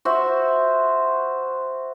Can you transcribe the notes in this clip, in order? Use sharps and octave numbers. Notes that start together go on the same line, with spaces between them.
F#4 C5 E5